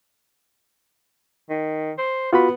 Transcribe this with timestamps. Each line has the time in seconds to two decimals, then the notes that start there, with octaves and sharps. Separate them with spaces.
1.50 D#3
1.98 C5
2.33 B3 F4 F#4 B5